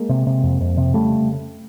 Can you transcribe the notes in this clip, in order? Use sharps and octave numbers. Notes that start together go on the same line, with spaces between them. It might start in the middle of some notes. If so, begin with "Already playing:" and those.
Already playing: G#3 A#3
C3
C3
F2
F2
C3
C#3 G3 A3